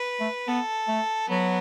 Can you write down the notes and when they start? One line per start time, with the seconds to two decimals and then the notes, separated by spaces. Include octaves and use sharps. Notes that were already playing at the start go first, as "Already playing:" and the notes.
Already playing: B4
0.20 A3
0.48 B3 A4
0.88 A3
1.29 F#3 B3